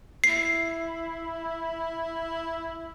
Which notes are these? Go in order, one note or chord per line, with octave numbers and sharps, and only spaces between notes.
E4 C7